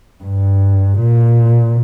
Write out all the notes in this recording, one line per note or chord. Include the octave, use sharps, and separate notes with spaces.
G2
A#2